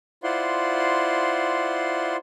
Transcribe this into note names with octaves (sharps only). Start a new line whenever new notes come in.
E4 F4 C5 D5 F#5 C6